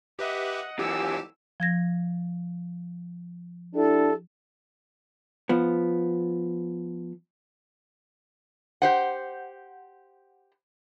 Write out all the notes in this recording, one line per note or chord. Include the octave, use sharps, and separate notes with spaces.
G4 B4 D#5 E5 F#5
F#2 E3 G4 E6
F3 G#6 A#6
D4 E4 G4 A4
F3 B3
G4 C5 F#5